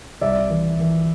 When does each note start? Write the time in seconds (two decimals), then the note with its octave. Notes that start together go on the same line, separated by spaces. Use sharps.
0.21 C2 D5 E5
0.50 E3
0.80 E3